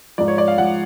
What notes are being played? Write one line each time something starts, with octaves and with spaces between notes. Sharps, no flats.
G#2 F3 D5
C#5
D5
F5
G#2 F3 F#5